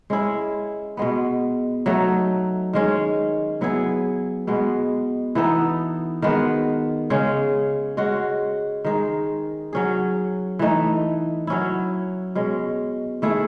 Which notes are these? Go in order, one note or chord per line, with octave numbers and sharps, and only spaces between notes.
G#3 C#4 E4 G#4
B2 G#3 B3
F#3 A3 D#4
D#3 G#3 C#4
F#3 B3 E4 G#4
B2 G#3 B3
E3 B3 D#4 A4
D#3 G#3 B3 F#4
C#3 G#3 C#4 G#4
G#3 C#4 F#4
D#3 G#3 D#4 G#4
F#3 C#4 G#4
E3 A3 D#4
F#3 C#4 E4
B2 G#3 C#4
D#3 A3 E4 G#4